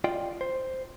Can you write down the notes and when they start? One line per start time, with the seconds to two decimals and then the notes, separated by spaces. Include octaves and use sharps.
0.04 F4 D5 D#5 G5
0.41 C5